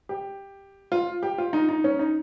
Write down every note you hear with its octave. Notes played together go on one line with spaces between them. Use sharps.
G4
F4
G4
F4
D#4
D#4
C#4
D#4